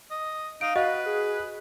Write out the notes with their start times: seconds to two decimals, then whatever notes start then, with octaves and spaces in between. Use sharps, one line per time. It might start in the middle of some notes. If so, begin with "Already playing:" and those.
0.10 D#5
0.61 D#4 F5 D7
0.76 F#4 B4 D#5
1.06 G#4